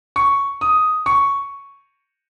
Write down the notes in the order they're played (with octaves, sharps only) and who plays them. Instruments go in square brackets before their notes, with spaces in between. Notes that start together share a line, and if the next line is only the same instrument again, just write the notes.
[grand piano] C#6
D#6
C#6